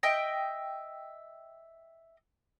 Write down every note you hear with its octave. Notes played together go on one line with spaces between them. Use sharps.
D#5 E5 G5